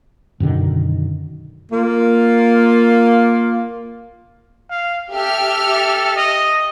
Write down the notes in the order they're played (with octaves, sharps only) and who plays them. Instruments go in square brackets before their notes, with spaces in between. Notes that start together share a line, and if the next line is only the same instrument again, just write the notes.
[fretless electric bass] F#2 B2 D3 D#3
[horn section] A#3 F4
[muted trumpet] F5
[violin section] G4 E5 F6 [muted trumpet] A4
[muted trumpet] D#5